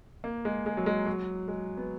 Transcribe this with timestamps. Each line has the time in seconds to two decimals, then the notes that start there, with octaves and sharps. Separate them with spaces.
0.24 A#3
0.45 G#3
0.66 G#3
0.77 F#3
0.86 G#3
1.07 F#3
1.48 G#3
1.77 B3